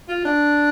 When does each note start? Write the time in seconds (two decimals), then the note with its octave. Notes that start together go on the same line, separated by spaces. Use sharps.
0.08 F4
0.25 D4